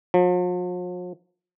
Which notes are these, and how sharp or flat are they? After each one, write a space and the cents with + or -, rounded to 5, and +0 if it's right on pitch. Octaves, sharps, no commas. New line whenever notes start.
F3 +45